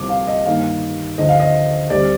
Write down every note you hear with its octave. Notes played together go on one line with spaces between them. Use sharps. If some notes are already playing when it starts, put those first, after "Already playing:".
Already playing: C2 C3 F3 D6
F5
D#5
G2 D#3 A#3 F5
D2 D3 F3 D#5
F5
D#5
D2 D3 G3 C4 D5